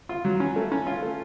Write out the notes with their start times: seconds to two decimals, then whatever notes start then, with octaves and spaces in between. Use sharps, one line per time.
0.09 F4
0.25 F#3
0.40 C#4
0.56 A3
0.72 C#4
0.87 F4
1.02 A3